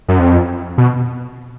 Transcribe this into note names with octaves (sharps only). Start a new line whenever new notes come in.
F#2
F2
B2